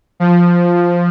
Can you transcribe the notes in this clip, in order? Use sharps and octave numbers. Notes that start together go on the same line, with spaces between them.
F3